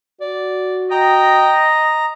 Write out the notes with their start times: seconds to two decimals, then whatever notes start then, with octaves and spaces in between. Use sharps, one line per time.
0.21 F#4 D5
0.91 D#5 G5 A#5